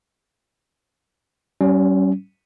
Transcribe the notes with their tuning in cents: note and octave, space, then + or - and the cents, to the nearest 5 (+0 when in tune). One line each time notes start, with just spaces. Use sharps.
G3 -45 C#4 +0